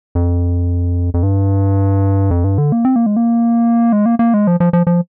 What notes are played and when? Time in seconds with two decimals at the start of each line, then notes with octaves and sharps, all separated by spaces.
0.15 F2
1.14 F2
1.23 G2
2.31 F2
2.44 G2
2.58 D3
2.72 A#3
2.85 C4
2.96 A#3
3.06 G#3
3.17 A#3
3.93 G#3
4.06 A#3
4.19 A#3
4.34 G#3
4.47 F3
4.60 F3
4.73 F3
4.87 F3